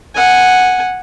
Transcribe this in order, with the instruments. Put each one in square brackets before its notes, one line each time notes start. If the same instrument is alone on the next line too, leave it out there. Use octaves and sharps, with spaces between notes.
[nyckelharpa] F#5 G#5